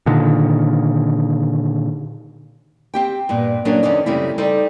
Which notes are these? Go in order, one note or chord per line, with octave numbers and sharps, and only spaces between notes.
A#2 D3 D#3
C4 G4 G5
G2 A#2 B3
F#3 A#3 C#4 D4 G#4 A#4
E2 D3 C4 C#4 D#4 D5
F#2 C#3 G3 A3 C4 E4
G3 D#4 A4 C5 D5